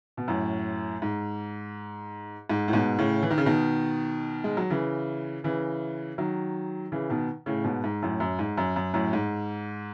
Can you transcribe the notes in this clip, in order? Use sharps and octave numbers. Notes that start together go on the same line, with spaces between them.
B2
F#2 A2
G#2
G#2
A2
G#2 B2
A2 C#3
E3
D#3
C#3
B2 D#3
G#3
F#3
C#3 E3
C#3 E3
D#3 F#3
C#3 E3
B2 D#3
A2 C#3
G#2 B2
G#2
F#2 A2
F#2
G#2
F#2
F#2
F#2 A2
G#2